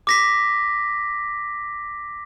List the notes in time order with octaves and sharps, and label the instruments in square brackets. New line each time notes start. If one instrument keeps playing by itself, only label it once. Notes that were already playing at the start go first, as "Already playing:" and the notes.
[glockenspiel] D6 A#6 B6